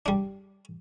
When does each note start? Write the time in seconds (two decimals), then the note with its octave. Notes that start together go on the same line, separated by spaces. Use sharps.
0.06 G3 D4